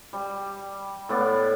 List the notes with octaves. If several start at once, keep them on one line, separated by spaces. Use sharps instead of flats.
G3
A2 B3 D5 F#5